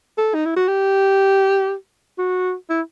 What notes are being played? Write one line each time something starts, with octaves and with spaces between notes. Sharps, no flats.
A4
D#4
E4
F#4
G4
F#4
E4